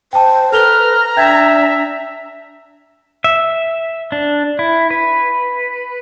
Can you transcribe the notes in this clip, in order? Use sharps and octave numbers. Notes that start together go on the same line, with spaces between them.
C5 G5 A5
A4 B4 A#5 F6 F7 G7
D4 E5 G5 G6 G#6
E5
D4
E4
B4